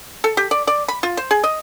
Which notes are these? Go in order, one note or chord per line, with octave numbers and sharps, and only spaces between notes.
A4
G4
D5
D5
B5
F4
C5
G#4
D#5